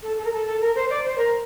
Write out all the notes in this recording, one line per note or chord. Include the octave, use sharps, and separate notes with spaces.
A4
A4
A#4
A4
A4
A#4
C5
D5
C5
A#4